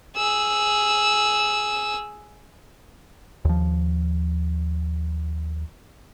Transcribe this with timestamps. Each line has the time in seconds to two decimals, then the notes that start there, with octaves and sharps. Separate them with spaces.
0.16 G#4 E6
3.45 D#2 F3